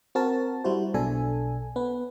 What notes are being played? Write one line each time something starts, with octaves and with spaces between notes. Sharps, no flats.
C4 F#4 A#4 A5
G3 E4 F#4 C5
B1 B2 D4 A4 G#5
B3 B4